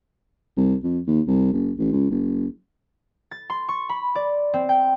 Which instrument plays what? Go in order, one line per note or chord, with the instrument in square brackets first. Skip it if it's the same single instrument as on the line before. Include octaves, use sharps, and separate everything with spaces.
[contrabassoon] C2
F2
D#2
C2
F#1
A1
C#2
F#1
[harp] A6
C6
C#6
B5
D5
C4
G5